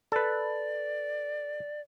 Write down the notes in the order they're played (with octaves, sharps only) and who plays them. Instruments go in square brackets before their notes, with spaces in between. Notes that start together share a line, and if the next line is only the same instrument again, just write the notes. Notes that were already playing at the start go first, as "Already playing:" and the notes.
[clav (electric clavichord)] A4 B4 [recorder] D5